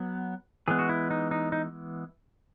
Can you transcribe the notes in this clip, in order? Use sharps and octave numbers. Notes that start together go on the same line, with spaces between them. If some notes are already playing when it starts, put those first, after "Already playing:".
Already playing: F#3 B3
E3 G#3 B3 G#4
F#4
E4
D#4
D#4
D#4